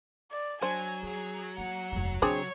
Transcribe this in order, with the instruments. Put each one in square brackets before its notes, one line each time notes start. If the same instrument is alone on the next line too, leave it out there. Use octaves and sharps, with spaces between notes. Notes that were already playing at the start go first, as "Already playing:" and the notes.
[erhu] D5
[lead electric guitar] F#3 [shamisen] D4 C5 [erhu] G#5
[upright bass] C#4 [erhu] G#4
[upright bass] A#3 [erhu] F#5
[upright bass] F1 D#2
[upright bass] C#3 [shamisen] C4 D4 G#4 [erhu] C#5